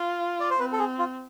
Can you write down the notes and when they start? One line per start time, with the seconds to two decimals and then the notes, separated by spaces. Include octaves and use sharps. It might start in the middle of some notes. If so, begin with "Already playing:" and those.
Already playing: F4
0.40 D5
0.50 C5
0.59 C4 B4
0.72 A4
0.79 G#4
0.99 F4